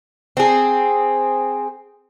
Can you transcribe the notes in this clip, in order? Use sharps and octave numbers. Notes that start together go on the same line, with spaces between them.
C4 G#4